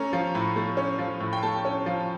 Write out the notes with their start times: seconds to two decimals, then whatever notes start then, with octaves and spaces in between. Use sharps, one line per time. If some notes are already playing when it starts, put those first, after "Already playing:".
Already playing: A3 C#4 A#5
0.13 F3
0.35 A2
0.56 A3
0.77 C#4
0.99 F3
1.20 A2
1.33 G5
1.43 A3 A5
1.65 C#4
1.86 F3